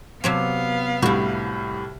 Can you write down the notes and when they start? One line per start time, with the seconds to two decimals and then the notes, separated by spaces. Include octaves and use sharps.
0.24 C3 F#3 B3 C4 F5
1.02 C2 A2 G3 E4 F#4